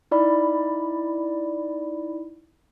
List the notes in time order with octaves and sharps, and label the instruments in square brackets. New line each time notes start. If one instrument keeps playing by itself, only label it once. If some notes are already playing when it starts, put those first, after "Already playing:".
[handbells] D#4 E4 D5 B5